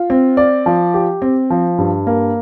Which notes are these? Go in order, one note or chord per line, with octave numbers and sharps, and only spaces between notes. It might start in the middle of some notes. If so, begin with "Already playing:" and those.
Already playing: F4
C4
D5
F3
G4
C4
F3
G2
A#3